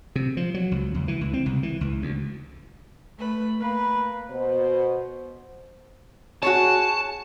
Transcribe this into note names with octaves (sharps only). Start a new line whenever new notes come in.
C3
F3
F#3
C#2
E2
E3
C#2
C4
C2
E3
C#2
D2
A3 B4
A#3 B4
B2 C5
F#4 G#4 C#5 A5